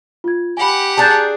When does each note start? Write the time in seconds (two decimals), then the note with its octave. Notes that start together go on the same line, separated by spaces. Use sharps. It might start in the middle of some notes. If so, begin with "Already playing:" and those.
0.24 F4 G#6
0.57 G4 F#5 G#5 B5
0.98 D4 G#4 A5 A#5 F#6 G6